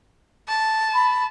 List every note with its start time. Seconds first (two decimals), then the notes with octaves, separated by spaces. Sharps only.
0.48 A5
0.95 B5